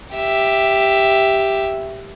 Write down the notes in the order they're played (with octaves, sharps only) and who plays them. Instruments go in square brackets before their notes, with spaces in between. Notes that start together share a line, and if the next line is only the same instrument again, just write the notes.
[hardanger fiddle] G4 E5